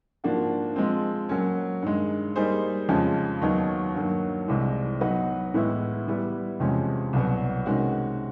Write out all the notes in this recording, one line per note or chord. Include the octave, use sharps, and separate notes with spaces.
G#2 F3 A#3 D4 F#4
F3 G#3 C4
F#3 A#3 C#4
G2 D#3 G#3
G3 A#3 D#4 G#4 C5
F2 C#3 F3 G#3 C#4
D#2 D#3 F#3 B3 D#4
G2 D#3 F#3 A#3
C2 C3 E3 G#3
F#3 B3 D#4 F#4 B4
A2 E3 G#3 B3 E4
E3 G3 B3 E4
E2 C3 F3 G#3 C#4
C2 B2 F#3 B3
C3 D#3 G#3 C#4 F#4